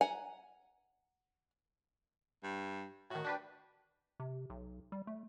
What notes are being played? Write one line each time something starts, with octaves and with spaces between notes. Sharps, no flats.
F#5 G#5 A#5
G2
A2 D#3 F#4
D4 G4 B4
C3
B1
G3
A3